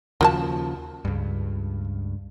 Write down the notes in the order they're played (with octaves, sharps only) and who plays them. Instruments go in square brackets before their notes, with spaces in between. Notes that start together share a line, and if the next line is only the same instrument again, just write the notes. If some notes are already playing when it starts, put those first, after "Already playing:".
[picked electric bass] D#2 C#3 F3 [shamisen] A#3 F#4 A5
[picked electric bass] C#2 G2